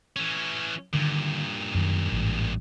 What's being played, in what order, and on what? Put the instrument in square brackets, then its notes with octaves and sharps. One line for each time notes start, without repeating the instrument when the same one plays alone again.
[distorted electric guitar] E3 C#4
[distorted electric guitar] G2 A#2 [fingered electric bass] D3 D#3
[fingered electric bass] F#2 D#3
A1 G#2 E3